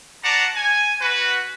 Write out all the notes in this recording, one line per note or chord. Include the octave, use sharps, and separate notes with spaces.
D4 F#4 D5 F#5 A5 A#5
G#5
F#4 B4